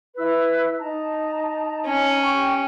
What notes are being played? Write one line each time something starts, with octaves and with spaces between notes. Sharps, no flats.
E4 B4 E6
D#4 A5 A#5
C#4
G4 G5 C#6